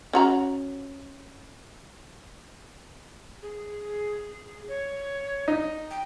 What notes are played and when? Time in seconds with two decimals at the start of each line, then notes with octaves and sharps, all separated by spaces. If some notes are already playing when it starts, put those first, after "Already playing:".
0.13 C#4 F#4 A#5
3.42 G#4
4.68 C#5
5.48 D#4
5.91 G5